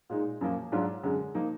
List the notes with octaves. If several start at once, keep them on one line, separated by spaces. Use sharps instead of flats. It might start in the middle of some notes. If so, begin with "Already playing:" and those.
A#2 G#3 D#4
F#2 F3 A#3
G#2 F#3 D4 F4
F#2 D3 G#3
F3 A#3 D#4